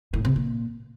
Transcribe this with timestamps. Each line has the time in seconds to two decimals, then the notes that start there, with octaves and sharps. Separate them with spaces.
0.13 A2
0.25 C3
0.36 A#2